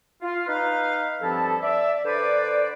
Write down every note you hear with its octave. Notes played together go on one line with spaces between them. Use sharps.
F4
D#4 B4 F5
G2 F3 C4 E4 A4
D5 E5
D3 B4 C5 D5